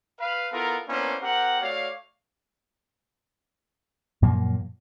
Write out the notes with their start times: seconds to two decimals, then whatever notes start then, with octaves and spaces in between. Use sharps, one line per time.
0.19 B4 F5
0.52 B3 E4 F4 A4 A#4
0.89 A#3 B3 C#4 D4 E4 C5
1.22 C4 G4 A#4 F#5
1.62 A3 F#4 C#5 D5 F5
4.22 F#2 A#2 F3 A#3